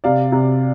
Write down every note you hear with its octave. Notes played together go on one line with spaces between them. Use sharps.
C3 D5 F5
C3